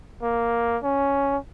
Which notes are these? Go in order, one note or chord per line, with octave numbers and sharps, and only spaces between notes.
A#3
C#4